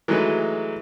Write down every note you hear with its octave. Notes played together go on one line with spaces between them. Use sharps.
E3 F#3 G#3 A3 D#4 B4